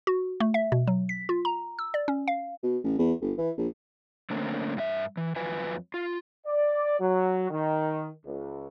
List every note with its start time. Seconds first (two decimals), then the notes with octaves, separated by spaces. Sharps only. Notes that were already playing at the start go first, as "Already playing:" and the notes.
0.07 F#4
0.40 A3
0.54 E5
0.72 B2
0.87 F#3
1.09 B6
1.29 F4
1.45 A#5
1.79 E6
1.94 D5
2.08 C#4
2.28 F5
2.63 B2
2.84 A1
2.99 E2
3.21 G1
3.38 E3
3.58 A#1
4.30 D3 A3 A#3 C4 C#4
4.77 G2 F#4 E5
5.17 E3
5.36 F2 F#3 F4 B4 G#5
5.94 F4
6.46 D5
7.00 F#3
7.50 D#3
8.25 C#2